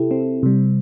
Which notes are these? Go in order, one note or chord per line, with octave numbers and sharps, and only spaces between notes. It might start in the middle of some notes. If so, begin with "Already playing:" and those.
Already playing: C3 E4 G4 A4
C4
C3 G3